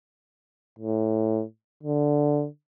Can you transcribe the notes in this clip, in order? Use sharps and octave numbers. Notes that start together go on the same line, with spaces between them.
A2
D3